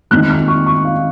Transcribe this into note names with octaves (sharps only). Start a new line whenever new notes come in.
D#3 G#3 C4 D#4 F#6
F6
C#6
C#6
F5